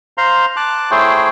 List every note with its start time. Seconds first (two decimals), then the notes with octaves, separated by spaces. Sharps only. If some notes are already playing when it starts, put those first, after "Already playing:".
0.18 C5 F5 A#5 C6
0.56 A5 D6 F#6
0.91 A3 E4 G#4 C5 C#5 G5